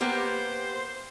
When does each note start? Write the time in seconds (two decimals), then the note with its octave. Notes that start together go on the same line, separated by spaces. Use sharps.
0.01 A#3 B3 G4 C5